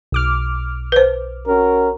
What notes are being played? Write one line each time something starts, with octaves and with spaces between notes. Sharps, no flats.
B1 D6 F6
B4 C5
C#4 F#4 A#4